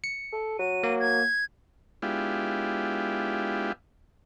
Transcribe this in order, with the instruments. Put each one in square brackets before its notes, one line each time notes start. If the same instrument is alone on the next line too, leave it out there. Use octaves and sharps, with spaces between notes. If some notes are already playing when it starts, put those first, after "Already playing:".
[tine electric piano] C#7
[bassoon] A4
[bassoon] F#3 [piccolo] D#7
[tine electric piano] A#3
[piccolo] G#6
[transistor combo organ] G#3 B3 D4 E4 F4 G4